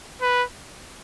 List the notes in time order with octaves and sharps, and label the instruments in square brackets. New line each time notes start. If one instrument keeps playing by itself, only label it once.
[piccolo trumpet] B4